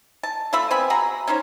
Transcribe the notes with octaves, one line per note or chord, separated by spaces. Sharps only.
A5
A3 F4 E5 B5
B3 C4 G#5 B5
F#4 G#4 A#5 B5
C#4 D#4 C5 C#5